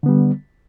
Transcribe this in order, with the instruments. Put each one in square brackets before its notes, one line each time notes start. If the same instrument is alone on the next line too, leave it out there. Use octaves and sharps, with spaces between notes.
[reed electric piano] D3
B3
G3